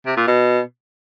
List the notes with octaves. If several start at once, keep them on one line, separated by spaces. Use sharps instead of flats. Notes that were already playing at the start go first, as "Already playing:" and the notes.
C3
A#2
B2